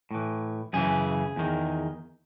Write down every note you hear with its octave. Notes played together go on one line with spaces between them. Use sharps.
A2 E3
F#2 C#3 E3 G#4
E2 D#3